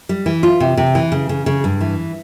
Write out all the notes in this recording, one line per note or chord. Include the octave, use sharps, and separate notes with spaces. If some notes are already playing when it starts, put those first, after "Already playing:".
G3
E3
F4
C3
C3
E3
C#3
C#3
C#3
G2
E3